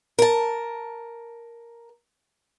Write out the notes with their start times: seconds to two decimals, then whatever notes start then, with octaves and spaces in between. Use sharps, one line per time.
0.19 A#4 A5